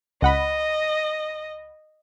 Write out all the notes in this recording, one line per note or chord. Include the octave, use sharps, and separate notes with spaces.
C#2 D#5 F#5 B5